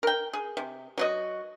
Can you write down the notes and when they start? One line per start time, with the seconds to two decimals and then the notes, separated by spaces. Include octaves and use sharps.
0.03 A#4 G5
0.33 G#4
0.57 C3
0.98 F#3 F#4 D#5